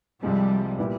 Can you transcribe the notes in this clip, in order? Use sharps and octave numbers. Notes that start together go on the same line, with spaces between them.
C2 C3 F3 G3 G#3 C4
A#2 G3 B3 E4 G4